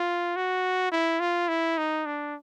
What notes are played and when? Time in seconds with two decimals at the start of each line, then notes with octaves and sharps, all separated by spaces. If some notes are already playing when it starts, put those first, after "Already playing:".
Already playing: F4
0.36 F#4
0.92 E4
1.20 F4
1.48 E4
1.78 D#4
2.06 D4